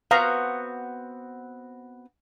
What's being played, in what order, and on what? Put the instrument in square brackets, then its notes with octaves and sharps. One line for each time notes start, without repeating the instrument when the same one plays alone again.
[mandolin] B3 C4 F#4 [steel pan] F5 A#5